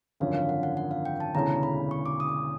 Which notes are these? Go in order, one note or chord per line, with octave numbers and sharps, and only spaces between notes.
G#1 F#2 D3 F3 F5
F5
F#5
F#5
F#5
F5
G5
A5
E1 D2 C#3 E3 A#5
B5
C#6
D6
D#6